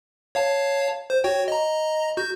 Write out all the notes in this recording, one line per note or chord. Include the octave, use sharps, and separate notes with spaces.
C#5 F5 A5
C5
F#4 C#5 G5
D#5 A#5
F#4 G6